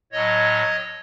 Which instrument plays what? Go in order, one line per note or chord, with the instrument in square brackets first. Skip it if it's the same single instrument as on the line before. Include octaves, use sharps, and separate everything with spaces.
[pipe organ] A2 F#3 C#5 D#5